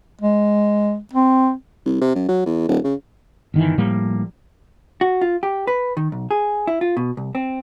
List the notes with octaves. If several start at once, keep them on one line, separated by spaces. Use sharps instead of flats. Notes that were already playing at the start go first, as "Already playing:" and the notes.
G#3
C4
C2
C3
F#2
F#3
E2
D#1
C#3
G1 D#3 E3
A2 F3 G3 A#3
F#4
F4
G4
B4
D#3
B1
G#4
E4
F4
B2
C2
C4